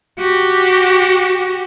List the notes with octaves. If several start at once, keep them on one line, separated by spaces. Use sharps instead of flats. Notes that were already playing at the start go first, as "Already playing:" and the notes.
F#4 G4